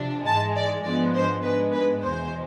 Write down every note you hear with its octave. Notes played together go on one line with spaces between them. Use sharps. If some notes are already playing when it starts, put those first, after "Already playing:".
Already playing: C3 F3 D4
G#2 E3 G#3 A5
D5
G#2 F3 G#3 B3 D4 D5
C5
G#2 G#3 B3 D4 B4
B4
E2 B2 G#3 C5